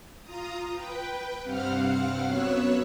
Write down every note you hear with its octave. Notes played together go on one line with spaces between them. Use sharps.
F4 A#5 D#6
B4 G5
G2 C3 C4 F5 F#5 F6
F#2 F#3 B3 C#5 E6 F#6